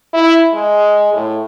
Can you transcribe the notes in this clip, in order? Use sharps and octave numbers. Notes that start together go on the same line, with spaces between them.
E4
G#3
A2